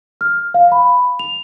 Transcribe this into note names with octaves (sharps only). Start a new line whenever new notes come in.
F6
F5
B5
F7